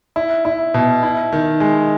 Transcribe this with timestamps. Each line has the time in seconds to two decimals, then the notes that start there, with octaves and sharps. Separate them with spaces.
0.16 E4
0.45 E4
0.74 B2
1.03 E4
1.32 D#3
1.60 G#3